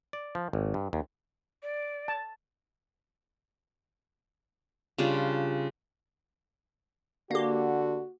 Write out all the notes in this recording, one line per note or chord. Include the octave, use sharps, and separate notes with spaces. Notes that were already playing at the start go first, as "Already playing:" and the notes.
D5
F3
G#1
G2
D#2
D5
A5
C#3 G3 D4 F4
D3 A#3 F#4 G4